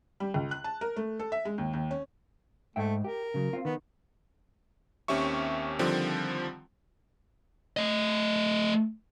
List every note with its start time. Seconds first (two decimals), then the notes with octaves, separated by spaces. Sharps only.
0.20 G3
0.34 C#2
0.51 F#6
0.64 A5
0.81 A#4
0.96 A3
1.19 A4
1.32 E5
1.45 G#3
1.58 D#2
1.73 D#2
1.91 C#4
2.76 G#2 A3 E5 G5
3.04 G4 A#4
3.34 C#3 F#3
3.53 C4 F4
3.65 D#3 B3
5.08 D#2 C4 C#4 G4 E5 C#6
5.79 D3 D#3 F3 G3 C4
7.77 A3 D#5